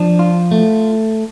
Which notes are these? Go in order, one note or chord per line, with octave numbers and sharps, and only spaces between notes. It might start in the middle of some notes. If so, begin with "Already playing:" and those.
Already playing: F3 D4
F4
A3